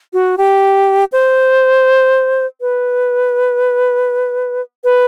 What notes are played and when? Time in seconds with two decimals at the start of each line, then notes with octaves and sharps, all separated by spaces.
0.13 F#4
0.38 G4
1.12 C5
2.61 B4
4.84 B4